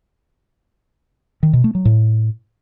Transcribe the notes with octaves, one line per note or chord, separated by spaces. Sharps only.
D#3
B2
A3
F#3
A2